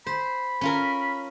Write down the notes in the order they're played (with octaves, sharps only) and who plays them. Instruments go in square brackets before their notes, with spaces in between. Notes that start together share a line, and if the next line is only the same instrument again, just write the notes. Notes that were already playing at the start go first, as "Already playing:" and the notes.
[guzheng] C5 [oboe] B5
[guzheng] C#4 F4 A#4